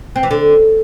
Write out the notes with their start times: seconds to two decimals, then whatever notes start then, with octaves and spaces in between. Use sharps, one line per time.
0.16 C4
0.23 E3
0.31 D3